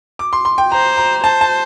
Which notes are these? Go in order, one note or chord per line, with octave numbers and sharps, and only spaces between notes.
D6
C6
C6
G5
C5 A#5
A#5
C5 A5
A5